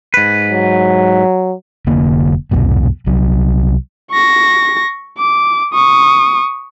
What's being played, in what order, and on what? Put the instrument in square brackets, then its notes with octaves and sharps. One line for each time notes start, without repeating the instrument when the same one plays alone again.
[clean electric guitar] G#2 B4
[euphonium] F#3
[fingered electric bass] F1 D3 A#3
C2 F2 G#2 B2
C2 F#3
[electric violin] C#6 A#6
D6
C#6 D#6